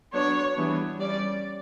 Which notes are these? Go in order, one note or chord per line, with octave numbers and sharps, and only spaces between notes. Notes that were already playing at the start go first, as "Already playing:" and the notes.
F#3 B3 D4 C#5
E3 G3 B3 D4
G3 C#4 D5